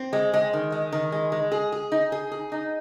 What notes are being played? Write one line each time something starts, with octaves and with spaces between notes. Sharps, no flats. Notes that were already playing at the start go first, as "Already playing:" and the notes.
Already playing: C4
G#3
G#3
D#3
G#3
D#3
G#3
G#3
G#4
G#4
D#4
G#4
G#4
D#4